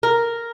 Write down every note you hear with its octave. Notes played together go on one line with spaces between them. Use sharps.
A#4